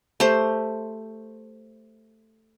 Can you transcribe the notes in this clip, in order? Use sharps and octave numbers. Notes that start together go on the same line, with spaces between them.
A3 G4 C5